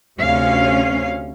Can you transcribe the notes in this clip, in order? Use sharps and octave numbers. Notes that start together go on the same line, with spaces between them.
D2 C3 C#4 F5